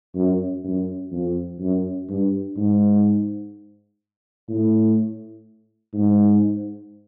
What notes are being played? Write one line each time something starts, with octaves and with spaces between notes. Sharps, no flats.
F#2
F#2
F2
F#2
G2
G#2
A2
G#2